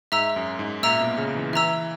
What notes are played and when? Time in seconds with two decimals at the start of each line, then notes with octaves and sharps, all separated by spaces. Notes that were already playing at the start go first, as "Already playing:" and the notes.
0.12 G#2 E5 A#5 E6
0.36 F#2
0.59 G#2
0.83 A#2 E5 A#5 E6
1.00 B2
1.18 C#3
1.36 E3
1.53 E3 E5 A#5 E6